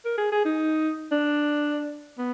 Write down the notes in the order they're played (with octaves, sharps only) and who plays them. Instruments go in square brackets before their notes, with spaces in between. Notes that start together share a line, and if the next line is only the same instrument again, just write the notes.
[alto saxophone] A#4
G#4
G#4
D#4
D4
B3